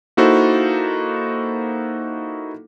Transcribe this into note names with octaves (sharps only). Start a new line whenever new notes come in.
A#3 D#4 E4 F#4 A4 C5